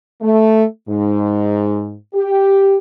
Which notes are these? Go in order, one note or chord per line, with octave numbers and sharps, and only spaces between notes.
A3
G#2
G4